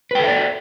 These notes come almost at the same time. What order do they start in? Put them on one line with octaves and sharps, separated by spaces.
B4 G5 A4 E5 D5